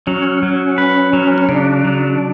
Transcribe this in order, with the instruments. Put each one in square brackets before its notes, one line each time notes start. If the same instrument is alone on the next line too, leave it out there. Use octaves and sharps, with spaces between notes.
[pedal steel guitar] F#3 [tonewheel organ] C#4
[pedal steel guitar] F#3
B4
F#3
[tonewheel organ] C#4
[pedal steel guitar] C#3 [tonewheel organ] D4
[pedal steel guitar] F#3